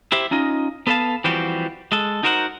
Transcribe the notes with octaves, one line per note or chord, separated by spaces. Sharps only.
E4 G4 C5 E5
C#4 D#4 F4 D#5
B3 A4 B4 C#5 F5 A5
E3 F3 G3 C4 F#4 G4
G#3 A4
D#4 F#4 A#4 C5 D#5 F#5